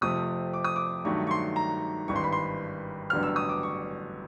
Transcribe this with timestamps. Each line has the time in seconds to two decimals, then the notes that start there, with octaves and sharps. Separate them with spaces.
0.01 F2 C3 F3 A3 D#6
0.54 D6
0.64 D#6
0.76 D6
1.05 G2 D#3 F#3 A3 C#6
1.27 C#6
1.31 C6
1.56 A#5
2.08 G#1 G2 E3 C#6
2.16 C6
2.24 B5
2.32 C6
3.10 A1 G2 D3 F#3 B3 F6
3.23 E6
3.36 D#6
3.49 D6
3.63 C#6